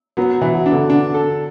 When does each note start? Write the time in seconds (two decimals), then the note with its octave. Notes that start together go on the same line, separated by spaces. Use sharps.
0.17 F#3 B3
0.41 E3
0.54 F#3
0.66 D4
0.72 D3
0.90 D4
1.14 A4